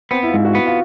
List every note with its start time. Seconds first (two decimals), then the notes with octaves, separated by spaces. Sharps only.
0.11 B3 C4
0.23 E4
0.28 F4
0.34 G#2
0.45 F#4
0.55 B3
0.67 F4